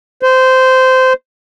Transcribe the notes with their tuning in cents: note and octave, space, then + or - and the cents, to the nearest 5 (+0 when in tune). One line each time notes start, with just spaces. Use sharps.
C5 -15